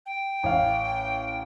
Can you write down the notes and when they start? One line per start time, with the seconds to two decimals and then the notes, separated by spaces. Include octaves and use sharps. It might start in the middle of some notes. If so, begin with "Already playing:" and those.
0.06 G5
0.43 A1 F5